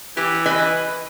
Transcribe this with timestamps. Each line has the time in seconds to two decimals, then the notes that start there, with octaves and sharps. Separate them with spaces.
0.17 E3 G4
0.46 B4 D#5 G#5